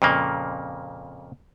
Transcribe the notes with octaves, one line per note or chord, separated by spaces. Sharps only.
F2 A#2 C#3 A#3